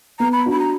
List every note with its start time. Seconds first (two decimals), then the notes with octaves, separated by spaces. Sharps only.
0.19 B3 A#5
0.32 B5
0.46 D4 F#4
0.52 B5
0.60 A#5